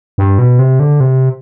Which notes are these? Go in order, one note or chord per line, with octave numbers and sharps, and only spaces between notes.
G2
B2
C3
D3
C3